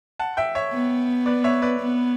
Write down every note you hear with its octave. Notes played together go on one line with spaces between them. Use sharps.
F#5 A5
E5 G5
C#5 E5
B3
B4 D5
C#5 E5
B4 D5
B3